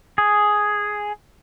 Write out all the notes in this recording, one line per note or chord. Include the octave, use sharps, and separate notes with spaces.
G#4